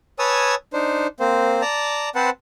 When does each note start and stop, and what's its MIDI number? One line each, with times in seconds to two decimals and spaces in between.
0.19 0.55 71
0.19 0.55 73
0.19 0.55 80
0.19 0.55 81
0.19 0.55 87
0.19 0.55 88
0.73 1.07 62
0.73 1.07 63
0.73 1.07 72
1.20 1.61 58
1.20 1.61 60
1.20 1.61 72
1.61 2.09 74
1.61 2.09 81
1.61 2.09 82
2.15 2.30 60
2.15 2.30 71
2.15 2.30 72
2.15 2.30 78
2.15 2.30 81